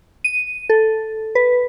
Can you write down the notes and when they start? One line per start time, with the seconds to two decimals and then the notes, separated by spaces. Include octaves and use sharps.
0.24 D#7
0.70 A4
1.35 B4